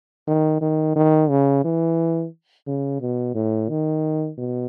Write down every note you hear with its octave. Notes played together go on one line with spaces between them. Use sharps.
D#3
D#3
D#3
C#3
E3
C#3
B2
A2
D#3
B2